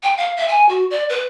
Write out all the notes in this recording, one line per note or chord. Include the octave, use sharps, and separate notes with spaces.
G5
F5
E5
G#5
F#4
D5
B4